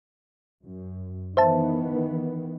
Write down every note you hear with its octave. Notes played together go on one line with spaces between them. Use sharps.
F#2
D#3 E3 B3 C5 E5 A5